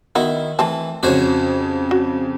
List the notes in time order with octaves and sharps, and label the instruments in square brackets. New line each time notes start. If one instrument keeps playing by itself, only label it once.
[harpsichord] D#3 E4 [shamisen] B3 D#4 F#4
[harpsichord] E3 [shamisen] A3 C4 A5
[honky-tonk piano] F2 C#3 [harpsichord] F#4 C5 C#5
[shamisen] F#4